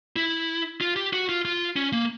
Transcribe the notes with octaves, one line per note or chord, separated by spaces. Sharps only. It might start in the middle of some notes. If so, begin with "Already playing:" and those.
E4
F4
G4
F#4
F4
F4
C#4
A#3